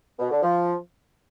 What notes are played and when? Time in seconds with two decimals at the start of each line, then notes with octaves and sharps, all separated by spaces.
0.20 B2
0.31 D3
0.43 F3